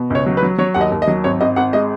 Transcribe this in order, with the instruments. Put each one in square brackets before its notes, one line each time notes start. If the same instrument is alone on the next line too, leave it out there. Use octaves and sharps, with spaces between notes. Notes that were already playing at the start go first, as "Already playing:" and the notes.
Already playing: [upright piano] B2
C#2 C#5
F#3
B4
F#3
F#3 C#5
D#2 F#5
D#5
D#2
D#5
F#3
G#1 C#5
G#1 D#5
G#1 F#5
G#3 D#5